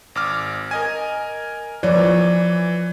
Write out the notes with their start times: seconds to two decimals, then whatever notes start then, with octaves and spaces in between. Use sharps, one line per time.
0.15 G#1 D6 F6
0.71 A#4 D#5 G#5
1.83 E3 F3 C#5 D5